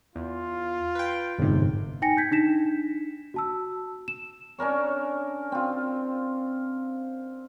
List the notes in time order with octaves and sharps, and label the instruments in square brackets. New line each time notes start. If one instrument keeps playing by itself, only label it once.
[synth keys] E2 [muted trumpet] F4
[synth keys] B4 G5
[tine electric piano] G1 G#2 [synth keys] F2 C3
[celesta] D#4 G5 G#5 A#6 C#7
G6 G#6 B6
D4 D#4 B6 E7
F#4 A5 E6
E7
[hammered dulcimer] C#4 D4 A#4 C#5
C4 F4